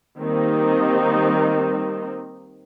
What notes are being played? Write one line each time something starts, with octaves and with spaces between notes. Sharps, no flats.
D#3 G3 A#3 C4 D#4